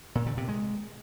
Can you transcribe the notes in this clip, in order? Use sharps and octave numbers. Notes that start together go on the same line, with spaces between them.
A#2
D3
C3
G#3